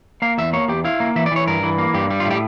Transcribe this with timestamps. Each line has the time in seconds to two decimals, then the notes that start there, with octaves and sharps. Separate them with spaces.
0.22 A#3 F5
0.38 E2 E5
0.53 A#3 C#5
0.68 E2 G4
0.85 E4 F5
1.00 A#3
1.15 E3 E5
1.26 D5
1.31 E3 C#5
1.47 G2 A#4
1.63 E3
1.78 A#3
1.94 G2 G4
2.10 G3
2.20 F4
2.26 A2 G4